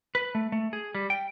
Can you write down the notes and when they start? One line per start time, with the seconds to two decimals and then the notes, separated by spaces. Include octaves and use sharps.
0.15 B4
0.35 A3
0.52 A3
0.73 G#4
0.95 G3
1.10 G5